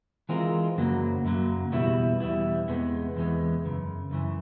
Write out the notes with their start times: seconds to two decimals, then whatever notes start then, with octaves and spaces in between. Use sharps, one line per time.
0.29 E3 G#3 C4 F4 A#4
0.77 F#2 C#3 F#3 A#3
1.25 F#2 C#3 F#3 A#3
1.72 E2 B2 G3 B3 E4
2.20 E2 B2 G3 B3 E4
2.68 E2 C3 E3 G#3 B3
3.16 E2 C3 E3 G#3 B3
3.65 F#2 C#3
4.11 F#2 C#3 E3